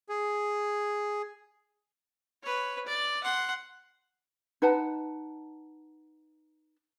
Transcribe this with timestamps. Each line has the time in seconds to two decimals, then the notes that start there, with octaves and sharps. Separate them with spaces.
0.09 G#4
2.42 B4 C#5
2.86 D5
3.23 F#5 C6
4.62 D#4 B4 F#5 A5